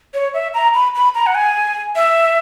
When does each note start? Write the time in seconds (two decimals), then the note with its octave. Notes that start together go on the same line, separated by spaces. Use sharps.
0.14 C#5
0.34 E5
0.54 A#5
0.74 B5
0.95 B5
1.15 A#5
1.26 F#5
1.35 G#5
1.96 E5